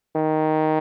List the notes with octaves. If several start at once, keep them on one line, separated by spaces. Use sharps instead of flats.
D#3